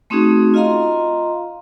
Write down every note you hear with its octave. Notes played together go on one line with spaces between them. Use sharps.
A3 C4 C#4 D#4 F#4 G#4
F4 D#5 F5 A#5 C6